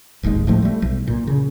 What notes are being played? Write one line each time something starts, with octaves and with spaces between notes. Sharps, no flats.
D1 G#1 D#2 G#3
A2 F3 A3
G3 A3
B1
A#2
C#3